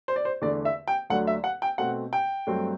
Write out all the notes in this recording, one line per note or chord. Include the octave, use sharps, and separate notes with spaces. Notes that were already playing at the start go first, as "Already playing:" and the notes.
C5
D5
C5
E2 D3 A3 D4 D5
E5
G5
D2 D3 F#3 A3 D4 F#5
E5
F#5
G5
B2 A3 C4 F#5
G5
G2 F#3 A3 C4